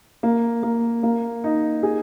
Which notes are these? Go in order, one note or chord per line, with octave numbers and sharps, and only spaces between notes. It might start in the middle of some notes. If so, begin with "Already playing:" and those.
A#3
A#3
A#3
D#4
G#4